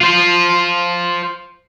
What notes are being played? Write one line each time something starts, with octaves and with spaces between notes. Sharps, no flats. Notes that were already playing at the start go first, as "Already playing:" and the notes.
F4 C5